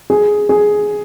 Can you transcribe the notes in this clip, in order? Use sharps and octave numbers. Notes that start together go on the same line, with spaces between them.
G#4
G#4